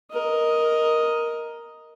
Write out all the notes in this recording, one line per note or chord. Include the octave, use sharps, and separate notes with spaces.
A#4 D#5